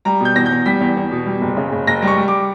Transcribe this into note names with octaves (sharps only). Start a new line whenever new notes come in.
G3 A#5
B2 G6
E2 A#6
E2 G6
G3 B6
E2
E2
B2
G3
F#1
C#3
F#1
F#1 A#6
G3
C#6
G3
D6